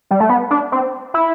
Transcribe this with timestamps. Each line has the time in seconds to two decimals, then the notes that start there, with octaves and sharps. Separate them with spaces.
0.11 G3
0.20 A3
0.29 B3
0.51 D4
0.72 C4
1.14 E4